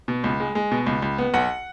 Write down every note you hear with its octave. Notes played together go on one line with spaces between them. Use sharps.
B2
C#2
G#3
G#3
B2
C#2
C#2
B3
B1 F#5